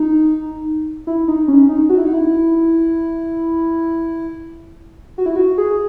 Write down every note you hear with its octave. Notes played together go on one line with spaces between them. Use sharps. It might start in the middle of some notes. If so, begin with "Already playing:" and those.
Already playing: D#4
E4
D#4
C#4
D#4
F#4
E4
D#4
E4
F#4
E4
F#4
G#4